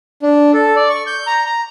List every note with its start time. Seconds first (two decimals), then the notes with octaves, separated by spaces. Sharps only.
0.22 D4
0.54 A4
0.76 D5
0.90 C#6
1.07 G6
1.27 A#5
1.46 A#5